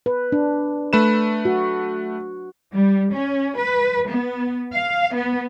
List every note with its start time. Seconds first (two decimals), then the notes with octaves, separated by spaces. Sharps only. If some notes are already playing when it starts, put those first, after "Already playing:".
0.06 B4
0.32 D4
0.93 A3 B4 E7
1.45 F#4
2.73 G3
3.12 C#4
3.57 B4
4.08 B3
4.71 F5
5.14 B3